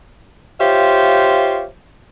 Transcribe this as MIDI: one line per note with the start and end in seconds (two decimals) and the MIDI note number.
0.61 1.66 65
0.61 1.66 67
0.61 1.66 72
0.61 1.66 73
0.61 1.66 76
0.61 1.66 77